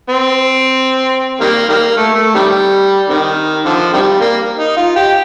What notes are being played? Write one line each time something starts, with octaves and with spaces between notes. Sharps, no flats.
C4
D#3 G3 A#3
D#3 G3 A#3
A3
A3
C3 D#3 G3
C3 D#3
D3 F3
C3 D#3 G3
A#3
D#4
F4
G4